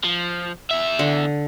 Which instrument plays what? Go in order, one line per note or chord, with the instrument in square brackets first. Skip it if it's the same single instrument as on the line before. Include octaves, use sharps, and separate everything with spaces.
[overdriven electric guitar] F3
E2 E5
[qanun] D3